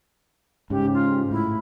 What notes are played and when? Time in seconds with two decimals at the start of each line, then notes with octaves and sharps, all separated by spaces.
0.70 G#2 C#3 G4
0.93 F4
1.31 A2 E4